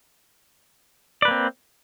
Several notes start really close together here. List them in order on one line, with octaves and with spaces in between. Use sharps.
D5 B4 A#3 C4